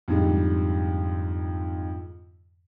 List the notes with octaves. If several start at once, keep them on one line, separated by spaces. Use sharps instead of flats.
F2 G#2 D3 G3 G#3